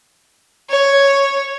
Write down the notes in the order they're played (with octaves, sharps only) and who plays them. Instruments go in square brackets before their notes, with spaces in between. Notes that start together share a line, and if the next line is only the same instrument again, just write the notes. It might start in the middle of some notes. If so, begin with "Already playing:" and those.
[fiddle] C#5